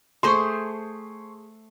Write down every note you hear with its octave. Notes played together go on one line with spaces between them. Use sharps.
A3 G#4 C5 C6 C#6